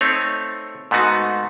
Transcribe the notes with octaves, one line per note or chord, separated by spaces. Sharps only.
A3 C4 D#4 C#5
G#2 A3 B3 D#4 F#4